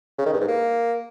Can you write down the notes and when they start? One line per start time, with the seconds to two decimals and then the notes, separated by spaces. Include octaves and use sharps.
0.18 C#3
0.26 D#3
0.33 G2
0.41 G#2
0.48 A#3